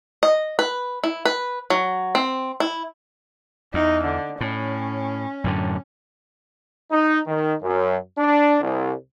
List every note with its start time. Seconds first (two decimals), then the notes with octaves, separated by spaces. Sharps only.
0.23 D#5
0.59 B4
1.04 E4
1.25 B4
1.70 F#3
2.15 C4
2.60 E4
3.74 E2 D#4
4.04 D3
4.41 A2 C#4
5.44 F#2 A2 D3
6.91 D#4
7.27 D#3
7.62 F#2
8.18 D4
8.61 C2